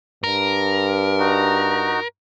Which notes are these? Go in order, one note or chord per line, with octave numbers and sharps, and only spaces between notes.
G2 A#4
D#4 F#4